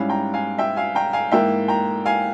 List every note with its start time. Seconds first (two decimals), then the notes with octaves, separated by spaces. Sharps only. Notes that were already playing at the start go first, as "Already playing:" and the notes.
Already playing: G#2 G3 C#4 E4 F5 G#5
0.09 G5 A#5
0.34 F5 G#5
0.58 E5 G5
0.76 F5 G#5
0.95 G5 A#5
1.13 F5 G#5
1.31 G#2 E3 A#3 E5 G5
1.68 G5 A#5
2.06 F5 G#5